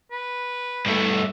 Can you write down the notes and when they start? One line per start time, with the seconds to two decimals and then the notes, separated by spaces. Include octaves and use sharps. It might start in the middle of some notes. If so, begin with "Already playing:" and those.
0.12 B4
0.86 G2 A3